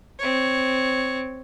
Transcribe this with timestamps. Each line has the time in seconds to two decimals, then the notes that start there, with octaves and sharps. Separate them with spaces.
0.19 C4 C#5